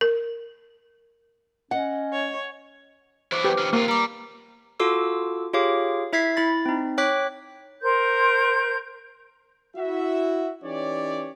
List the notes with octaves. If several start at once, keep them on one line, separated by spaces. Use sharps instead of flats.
A#4
C#4 D#5 F#5
C#5
E2 F#3 E4 C5 C#6 D6
G4 B4
D#3 F3 C#4
C3 A3 A#3 F4
G3 A#5 D6
F4 F#4 A4 D6 E6
F4 G4 G#4 C#5 F5 D6
E4 E5 G#6 B6 C7
E4 B5 A6
C4 D#4
C#5 G5 D6 F#6 B6
A#4 C5 C6 G6
E4 F#4 E5
E3 C#4 D#4 G4 C#5 D5